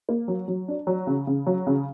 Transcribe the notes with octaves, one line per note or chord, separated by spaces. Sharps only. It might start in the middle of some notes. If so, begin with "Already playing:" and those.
A#3
F#3
F#3
D4
F#3
C#3
C#3
F#3
C#3